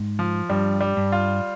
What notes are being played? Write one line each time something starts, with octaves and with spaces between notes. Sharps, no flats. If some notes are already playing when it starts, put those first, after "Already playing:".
Already playing: G#2
F3
G2 G3
G3
G2
F4